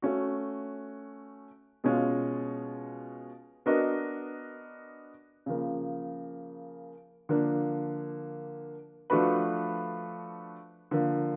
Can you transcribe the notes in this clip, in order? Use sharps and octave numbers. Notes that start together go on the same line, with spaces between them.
A3 C#4 F#4
B2 G#3 C#4 F4
B3 D4 F#4 A#4 D#5
C#3 F3 A#3
D3 F3 A#3 D4
F3 A3 D4 F#4 B4
D3 F3 A#3